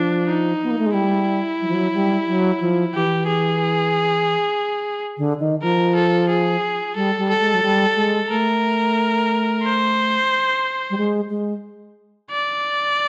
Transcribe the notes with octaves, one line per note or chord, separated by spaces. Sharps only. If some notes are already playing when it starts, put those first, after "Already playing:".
Already playing: F3 D4
D#4
B3
A#3
A3
G#3
G3 E4
F#3
F3
F#3
G3
F#3
F3
E3 G4
G#4
D3
D#3
F3 A#4
A4
G#4
G3 A4
G3
A4
G#3
F#3
G3
G#3
A3 A#4
C5
G3
G#3
G#3
D5